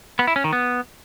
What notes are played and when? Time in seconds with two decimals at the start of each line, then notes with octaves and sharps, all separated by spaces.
0.19 B3
0.27 E4
0.36 C#4
0.44 D#3
0.53 B3